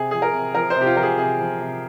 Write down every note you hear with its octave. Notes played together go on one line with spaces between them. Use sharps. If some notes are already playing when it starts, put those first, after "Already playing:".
Already playing: C3 G#4
F3 G#4
A#4
C3
F3 A#4
C5
C3
G4
F4
F3 A#4
G#4
C3 G#4
F3
C3